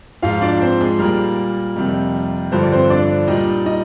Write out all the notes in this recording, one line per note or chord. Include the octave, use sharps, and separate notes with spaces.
G#2 F3 F4 F5
D4 D5
C4 C5
G#3 G#4
A#2 G3 A#3 A#4
F2 C3 D#3 G3
G2 D3 F3 C5
D5
C4 C5
D4 D5
A#2 G3 D#4 D#5
D#4 D#5